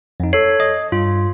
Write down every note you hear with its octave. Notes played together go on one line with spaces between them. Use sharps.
F2 D#4
A4 C#5 C7
D#5
G2 F4